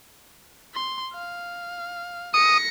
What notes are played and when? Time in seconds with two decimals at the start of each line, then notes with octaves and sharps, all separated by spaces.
0.74 C6
1.14 F5
2.34 D#6 A#6 C#7